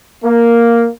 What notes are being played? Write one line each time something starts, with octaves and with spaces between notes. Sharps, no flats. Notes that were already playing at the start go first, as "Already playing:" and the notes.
A#3